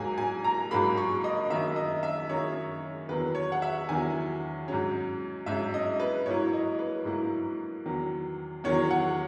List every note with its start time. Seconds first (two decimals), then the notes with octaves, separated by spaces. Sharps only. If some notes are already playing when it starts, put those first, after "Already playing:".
Already playing: G#2 F#3 A#3 G#5
0.18 G#5
0.44 A#5
0.71 G#2 F#3 A#3 B5
0.97 C#6
1.24 D#5
1.50 F#2 D#3 A#3 D#4 E5
1.76 D#5
2.03 E5
2.29 F#2 D#3 A#3 D#4 C#5
3.09 E2 D#3 F#3 B4
3.35 C#5
3.52 F#5
3.62 E5
3.89 E2 D#3 F#3 G#5
4.68 G#2 F#3 C#4
5.46 G#2 F#3 C#4 E5
5.74 D#5
6.00 B4
6.26 G#2 F#3 A#3 E4 C#5
6.53 D#5
6.79 B4
7.05 G#2 F#3 A#3 E4
7.85 E2 D#3 F#3
8.64 E2 D#3 F#3 C#5
8.90 F#5